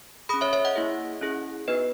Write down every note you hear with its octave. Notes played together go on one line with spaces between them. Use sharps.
C#4 G#4 B5 D#6
C#5 E5
C#5 E5
D#5 F#5
A#3 E4 G#4
C#4 E4 G#4
B3 D#4 F#4 B4 D#5